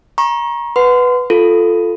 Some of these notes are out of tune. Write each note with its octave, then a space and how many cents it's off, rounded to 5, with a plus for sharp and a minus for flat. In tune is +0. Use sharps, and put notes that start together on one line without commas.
A#5 +30 C#6 -25
B4 +0 F#5 -10 C6 -30
F4 +0 A4 +0